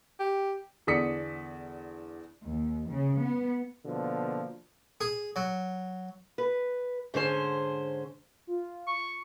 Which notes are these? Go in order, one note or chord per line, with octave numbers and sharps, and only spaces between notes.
G4
E2 D3 D5 D#6 B6 C#7
D#2
C#3
B3
B2 D3 F3 A#3
G#4
F#3
B4
G#2 D3 C#4 C5
F4
C#6